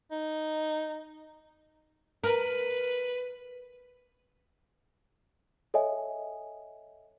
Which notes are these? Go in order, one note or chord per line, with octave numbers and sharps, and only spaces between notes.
D#4
A#4 B4
A4 C#5 D#5 E5 G#5